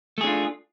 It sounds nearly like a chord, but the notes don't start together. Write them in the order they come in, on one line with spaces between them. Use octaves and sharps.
A3 G#4 D4 F4